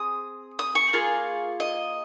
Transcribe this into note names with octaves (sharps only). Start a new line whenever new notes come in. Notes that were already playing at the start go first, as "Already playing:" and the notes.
Already playing: C4 G#4 D#6
D#6
C#6
A#3 F4 G#4
D#5